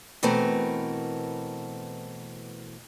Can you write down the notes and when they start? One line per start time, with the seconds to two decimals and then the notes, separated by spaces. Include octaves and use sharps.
0.23 B2 E3 A3 C4 A#4